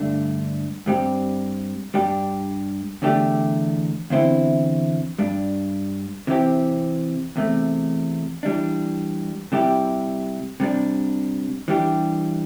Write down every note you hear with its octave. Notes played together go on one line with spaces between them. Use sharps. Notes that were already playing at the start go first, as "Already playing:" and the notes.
Already playing: G2 D3 A3 D4
G2 G3 C4 G4
G2 G3 D4 G4
E2 D3 A3 D4 G4
E2 D3 C4 E4
G2 G3 D4
C3 E3 C4 G4
E2 C3 A3
E3 G3 D4
C3 G3 E4 G4
C3 G3 D4
E3 G3 D4 G4